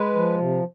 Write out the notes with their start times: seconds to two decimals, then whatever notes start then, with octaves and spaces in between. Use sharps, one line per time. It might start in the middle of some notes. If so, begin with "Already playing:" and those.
Already playing: G#3 B4
0.15 F3
0.40 C3